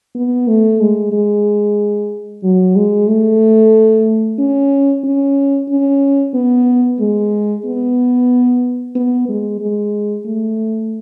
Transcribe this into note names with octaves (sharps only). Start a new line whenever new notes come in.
B3
A3
G#3
G#3
F#3
G#3
A3
C#4
C#4
C#4
B3
G#3
B3
B3
G#3
G#3
A3